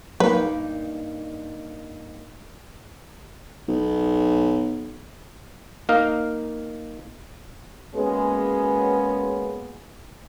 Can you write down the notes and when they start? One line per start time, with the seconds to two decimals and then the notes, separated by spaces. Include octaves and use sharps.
0.20 G2 F#3 A#3 D#4 B4
3.68 B1
5.89 A#3 D#4 A#4 F5
7.95 G#3 A#3 B3 C#4 F#4 G#4